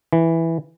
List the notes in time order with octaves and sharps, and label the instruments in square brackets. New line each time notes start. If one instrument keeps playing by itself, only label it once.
[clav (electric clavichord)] E3